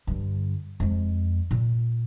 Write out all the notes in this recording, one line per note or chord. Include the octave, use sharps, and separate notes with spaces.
G2 D3
F2 G#3
A#2